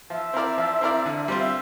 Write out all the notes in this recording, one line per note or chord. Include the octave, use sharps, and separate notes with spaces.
F3 E5
C4 E4 A#4 D5
F3
C4 E4 A#4 D5
D3
G3 C4 F4
E5